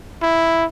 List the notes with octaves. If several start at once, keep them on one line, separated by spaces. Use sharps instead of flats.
E4